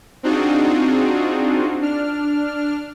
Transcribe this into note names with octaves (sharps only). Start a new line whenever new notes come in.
C4 D4 D#4 F4 F#4 G#4
D4 F6